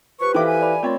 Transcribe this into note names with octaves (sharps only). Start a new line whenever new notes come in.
F3 G4 B4 C#6
E3 A4 E5 F5 G5 D6
G#5
D5 B5
A#2 A3 C4 F4 C#5